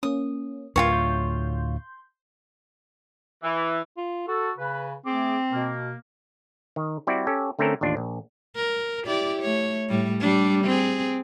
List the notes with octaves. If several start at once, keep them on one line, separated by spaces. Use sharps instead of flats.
A#3 C#4 D#6
D2 A2 F4 F#4 A#4 C#5 G5
C6 G6
E3
F4
F#4 A4
C#3 B4
A3 C4 G#4 D6
B2 A#3
D#3
G3 C4 E4 F#4 D5
C#4 G4 A4
D3 A3 C4 C#4 A4 A#4
A1 D#2 D4 F4
A#1
A#4
E4 G4 D5
A3 C#5
A2 G3
G3 D4
C4 G#4